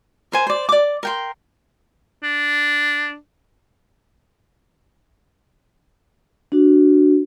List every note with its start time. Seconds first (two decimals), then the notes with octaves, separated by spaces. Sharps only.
0.32 A#4 C5 G#5
0.47 C5 D5
0.69 D5 D6
1.03 A#4 G5 C6
2.23 D4
6.52 D4 F#4